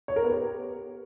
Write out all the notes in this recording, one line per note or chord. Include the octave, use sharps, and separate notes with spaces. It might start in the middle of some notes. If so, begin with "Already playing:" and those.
C#5
A#4
B3
G4